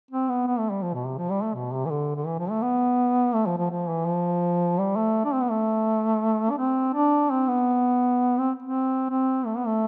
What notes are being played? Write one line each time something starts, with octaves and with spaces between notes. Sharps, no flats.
C4
B3
B3
A3
G3
F3
B2
C3
F3
G3
A3
B2
C3
E3
D3
D3
E3
F3
A3
B3
A3
F3
F3
F3
E3
F3
G3
A3
D4
C4
B3
A3
D4
C4
D4
C4
B3
C4
C4
C4
A3
B3
A3